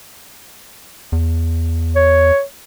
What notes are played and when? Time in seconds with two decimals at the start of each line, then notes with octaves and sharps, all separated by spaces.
1.12 E2
1.96 C#5